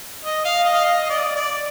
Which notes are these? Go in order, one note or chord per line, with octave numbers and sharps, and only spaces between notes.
D#5
F5
D#5
F5
D#5
D#5
D5
D5